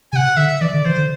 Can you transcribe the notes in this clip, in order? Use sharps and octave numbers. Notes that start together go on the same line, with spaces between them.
C3 G#5
F#5
D3 E5
E3 D5
D3
E3 C5
D3